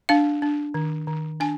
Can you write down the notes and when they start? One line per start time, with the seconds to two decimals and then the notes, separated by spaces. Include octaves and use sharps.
0.09 D4 F5
0.42 D4
0.74 D#3
1.07 D#3
1.40 D4 G#5